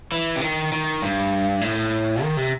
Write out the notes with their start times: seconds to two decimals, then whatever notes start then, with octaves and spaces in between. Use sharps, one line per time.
0.12 E3
0.36 C3
0.41 D#3
0.72 D#3
1.02 G2
1.61 A2
2.22 D#3
2.37 C3